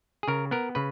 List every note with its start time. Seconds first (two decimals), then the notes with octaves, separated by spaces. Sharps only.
0.23 G#4
0.28 C#3 A#4
0.51 B3 A#4
0.75 C#3 B4